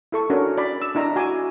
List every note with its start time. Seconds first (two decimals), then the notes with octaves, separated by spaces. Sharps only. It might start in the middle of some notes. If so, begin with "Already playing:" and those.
0.12 E4 A4 C#6
0.30 C#4 D4 F#4 A4 A#4
0.57 D5 B5
0.82 E6
0.95 D4 E4 D#5 A#5
1.16 F#4 G#5 D6